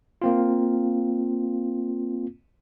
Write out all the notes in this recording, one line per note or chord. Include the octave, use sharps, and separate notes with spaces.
A#3 C4 F4